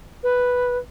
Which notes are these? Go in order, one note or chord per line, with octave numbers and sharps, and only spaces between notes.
B4